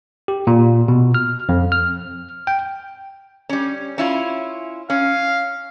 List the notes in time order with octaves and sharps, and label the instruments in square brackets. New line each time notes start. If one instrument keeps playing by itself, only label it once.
[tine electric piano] G4
A#2
B2
F6
F2
F6
G5
[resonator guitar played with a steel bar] G3 C#4
C#4 E4 F4
[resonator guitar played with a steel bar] C#4 [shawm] F5